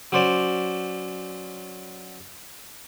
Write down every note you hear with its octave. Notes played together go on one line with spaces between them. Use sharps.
F#3 C#4 C5 D5 C6